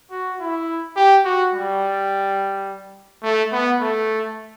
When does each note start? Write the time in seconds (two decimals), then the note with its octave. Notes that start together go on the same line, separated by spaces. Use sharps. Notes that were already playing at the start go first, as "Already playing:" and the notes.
0.11 F#4
0.40 E4
0.97 G4
1.25 F#4
1.54 G3
3.23 A3
3.52 B3
3.81 A3